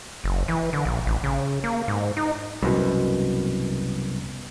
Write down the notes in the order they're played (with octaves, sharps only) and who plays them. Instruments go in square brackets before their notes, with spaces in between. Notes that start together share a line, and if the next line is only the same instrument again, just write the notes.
[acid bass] F#1
E3
D3
A#1
A1
C#3
A#3
G#2
D#4
[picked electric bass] C2 F#2 B2